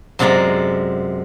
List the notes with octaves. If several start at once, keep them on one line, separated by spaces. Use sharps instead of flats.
F#2 C3 G#3 D5 A#5